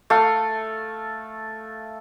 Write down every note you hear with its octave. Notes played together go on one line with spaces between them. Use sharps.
A3 F5